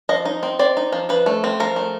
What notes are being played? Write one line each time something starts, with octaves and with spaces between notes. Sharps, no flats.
F3 D#5
D#4
C4
C4 D5
D#4
F3
F3 B4
A3
C4
F3 A#4
A3